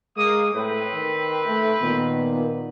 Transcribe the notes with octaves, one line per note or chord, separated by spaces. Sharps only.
G#3 A#3 D#6
A2 C4 B4
D#3
A3
A#2 D#3 B3